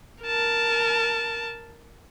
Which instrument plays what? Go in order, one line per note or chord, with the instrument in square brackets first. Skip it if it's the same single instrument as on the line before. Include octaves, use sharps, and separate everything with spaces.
[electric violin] A#4 A5